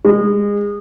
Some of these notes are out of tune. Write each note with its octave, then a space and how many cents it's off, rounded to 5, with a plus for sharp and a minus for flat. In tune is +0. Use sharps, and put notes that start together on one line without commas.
G#3 -30